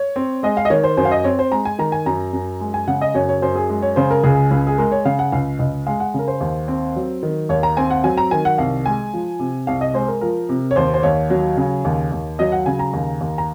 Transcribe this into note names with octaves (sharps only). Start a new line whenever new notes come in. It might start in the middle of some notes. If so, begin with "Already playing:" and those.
Already playing: C#5
C4
G#3 D#5
F5
D#5
D#3 C#5
C5
F#2 C5
F5
D#5
C4 C#5
C5
G#3 A#5
G#5
D#3 A#5
G#5
F#2 A#5
F#2
G#3
G#5
C#3 F#5
D#5
F#2 C#5
C#5
F#2 C5
G#4
G#3
C#5
C#3 C5
A#4
C#2 G#4
C#2
G#4
G#3 A#4
C#5
C#3 F5
F#5
C#2 F5
C#2 D#5
G#3 F5
F#5
C#3 A#4
C5
D#2
C4
F#3
D#3
D#2 C#5
A#5
C4 G#5
F#5
F#3 G#5
A#5
D#3 G#5
F#5
C2 F5
G#3 G#5
F3
C3
C2 F5
D#5
G#3 C5
A#4
F3 A#4
C3
C#5
D#2 C5
C5
D#2 C#5
F#3
C#3
D#2
D#2
F#3 D#5
F#5
C#3 G#5
A#5
D#2
D#2
A#5